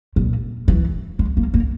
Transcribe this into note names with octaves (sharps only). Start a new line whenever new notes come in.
A#2
E3
G#3
A#3
A#3